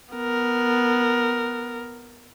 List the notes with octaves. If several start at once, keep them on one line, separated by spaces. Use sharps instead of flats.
B3 A#4